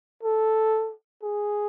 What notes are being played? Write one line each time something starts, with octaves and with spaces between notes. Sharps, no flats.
A4
G#4